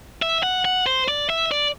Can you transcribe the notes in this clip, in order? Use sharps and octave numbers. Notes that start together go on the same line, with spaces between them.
E5
F#5
F#5
C5
D5
E5
D5